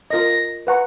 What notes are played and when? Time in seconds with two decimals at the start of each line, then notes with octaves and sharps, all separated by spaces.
0.10 F4 A#4 D#5 A#6
0.67 B4 F#5 A#5 C#6